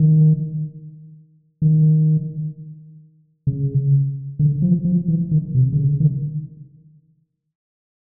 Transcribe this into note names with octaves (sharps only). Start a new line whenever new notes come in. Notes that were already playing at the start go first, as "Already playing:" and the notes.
Already playing: D#3
D#3
C#3
D3
F3
F3
E3
D#3
C3
D3
C#3
D#3